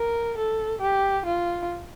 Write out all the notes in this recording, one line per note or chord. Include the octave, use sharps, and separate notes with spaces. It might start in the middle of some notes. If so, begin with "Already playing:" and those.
Already playing: A#4
A4
G4
F4